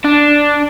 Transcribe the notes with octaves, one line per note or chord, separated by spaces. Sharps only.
D4